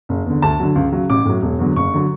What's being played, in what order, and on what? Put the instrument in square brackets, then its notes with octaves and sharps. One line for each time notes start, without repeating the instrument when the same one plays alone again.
[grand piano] F#1
E2 D3
D2 A5
D3 F#3
C#2
C#3 F#3
A1 D6
A2 F#3
E1
E2 D3 F#3
F#1 C#6
D3 F#3